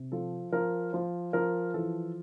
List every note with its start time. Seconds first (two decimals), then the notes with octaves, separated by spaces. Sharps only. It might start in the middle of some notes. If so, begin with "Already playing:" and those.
Already playing: C3
0.12 F3 A4
0.53 F3 A#4
0.93 F3 C5
1.33 F3 A#4
1.74 E3 A4